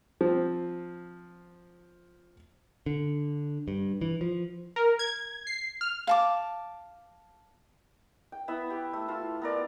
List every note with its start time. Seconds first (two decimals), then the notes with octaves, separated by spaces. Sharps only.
0.21 F3 C4
2.86 D3
3.68 G2
4.01 E3
4.21 F3
4.76 A#4
4.99 G#6
5.47 C7
5.81 F6
6.07 F5 A5 D6
8.32 G5
8.48 B3 E4 E5 B5
8.70 G4
8.93 A3
9.08 E4 F4 A5
9.42 B3 A#4 D5